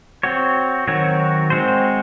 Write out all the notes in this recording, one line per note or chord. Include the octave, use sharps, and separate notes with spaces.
C4 F#4 C#5
D#3 F#3 C4 F#4 C#5
G#3 C4 F#4 C5